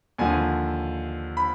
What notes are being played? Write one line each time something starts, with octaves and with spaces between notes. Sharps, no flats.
D#2 D3 F3 G#5
B5